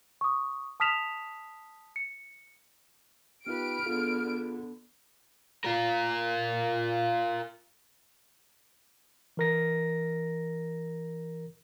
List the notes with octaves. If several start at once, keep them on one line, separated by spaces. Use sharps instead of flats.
C#6 D#6
A5 D#6 F6 B6 E7 F7
C#7
B3 D#4 F4 G4 B4 F6 D7
D3 B3 F4 G#4
F4 A#4
E3 A#4 A#6